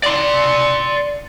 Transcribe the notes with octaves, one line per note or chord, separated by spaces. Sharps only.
D5 C6